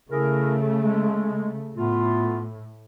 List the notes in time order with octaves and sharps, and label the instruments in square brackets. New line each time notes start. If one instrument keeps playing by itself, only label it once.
[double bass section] C#3 A3 [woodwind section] E4 G#4 A#4
[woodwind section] G#3
[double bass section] A2 [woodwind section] A3 B3 F4